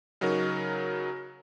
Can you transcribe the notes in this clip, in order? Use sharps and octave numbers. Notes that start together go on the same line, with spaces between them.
C#3 F#3 D#4 F#4 A#4